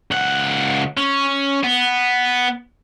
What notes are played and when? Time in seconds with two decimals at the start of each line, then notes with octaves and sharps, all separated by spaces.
0.11 C#2 F#5
0.97 C#4
1.64 B3